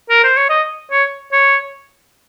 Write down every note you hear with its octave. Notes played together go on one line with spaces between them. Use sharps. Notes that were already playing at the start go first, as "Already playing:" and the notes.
A#4
C5
C#5
D#5
C#5
C#5